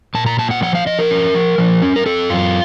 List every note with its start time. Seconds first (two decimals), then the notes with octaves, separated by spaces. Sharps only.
0.15 A#2 A5
0.26 A#5
0.39 A#2 A5
0.51 F#5
0.62 F3 F#5
0.75 F5
0.87 F3 D#5
0.99 A#4
1.11 C#4
1.34 F3
1.58 F3
1.82 C#4
1.96 A#4
2.06 C4 A4
2.30 F#2 F4